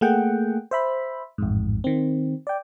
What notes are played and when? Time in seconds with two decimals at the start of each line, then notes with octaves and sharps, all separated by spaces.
0.01 A3 A#3 G#4 F#5 G5
0.71 C5 E5 B5
1.38 A1 F2 G#2
1.84 D#3 C4
2.47 D5 G5